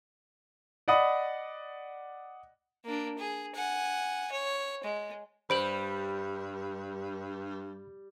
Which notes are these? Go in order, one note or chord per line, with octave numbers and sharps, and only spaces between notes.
D5 D#5 F#5 B5 D#6
A#3 D4
G#4
F#5 G#5
C#5
G#3
G2 G3 C5 B5 D7 F#7